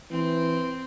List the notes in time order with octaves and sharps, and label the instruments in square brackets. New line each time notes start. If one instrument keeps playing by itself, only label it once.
[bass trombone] E3 [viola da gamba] C4